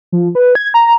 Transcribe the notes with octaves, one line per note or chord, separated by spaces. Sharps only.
F3
B4
G#6
A#5